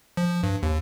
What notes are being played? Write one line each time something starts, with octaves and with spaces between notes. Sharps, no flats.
F3
G2
D#2